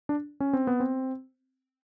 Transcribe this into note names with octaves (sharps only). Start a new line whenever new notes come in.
D4
C#4
C4
B3
C4